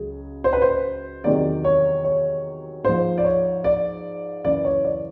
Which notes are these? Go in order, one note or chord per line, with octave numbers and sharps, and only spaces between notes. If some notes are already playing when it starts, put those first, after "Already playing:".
Already playing: C#2 C#3 F#3 G#4
C5
B4
C5
E2 C3 D#3 F#3 D5
C#5
C#5
G#2 F3 C5
D5
C#5
D5
F#2 C#3 E3 D5
C#5
D5